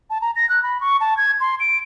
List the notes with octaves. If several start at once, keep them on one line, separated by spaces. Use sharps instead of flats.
A5
A#5
A#6
F#6
B5
C#6
A5
G#6
C6
D7